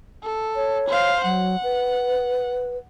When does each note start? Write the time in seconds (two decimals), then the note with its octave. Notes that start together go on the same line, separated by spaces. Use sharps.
0.23 A4
0.56 C#5
0.89 C5 F5
1.24 F#3 F#5
1.63 B4